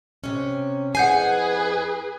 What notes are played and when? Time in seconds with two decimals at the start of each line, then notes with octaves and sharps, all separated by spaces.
0.24 C3 C#4
0.95 F2 E4 G#4 B4 F#5 G#5 G6 C7